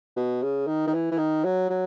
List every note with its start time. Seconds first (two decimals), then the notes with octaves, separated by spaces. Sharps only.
0.16 B2
0.43 C#3
0.67 D#3
0.87 D#3
0.94 E3
1.11 E3
1.18 D#3
1.44 F#3
1.69 F#3